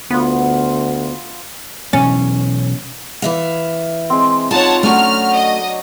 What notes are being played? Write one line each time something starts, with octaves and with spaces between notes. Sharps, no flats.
D2 B3 F4 F#5 B5
B2 E3 F#3 C#4
E3 E5 F5
G#3 C4
D#4 F4 C#5 F#5 A5
F#3 A3 C#4 D4 F#4 F6
D#5